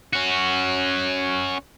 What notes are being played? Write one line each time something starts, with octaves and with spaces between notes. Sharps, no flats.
C#4 F#4